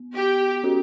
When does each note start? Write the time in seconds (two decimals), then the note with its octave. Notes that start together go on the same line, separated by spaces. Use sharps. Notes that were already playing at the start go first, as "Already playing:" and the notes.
Already playing: B3
0.17 G4
0.64 C#4 F#4 A4